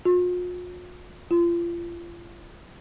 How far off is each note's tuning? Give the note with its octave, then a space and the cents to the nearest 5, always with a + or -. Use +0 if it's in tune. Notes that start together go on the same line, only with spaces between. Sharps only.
F4 +45
F4 -30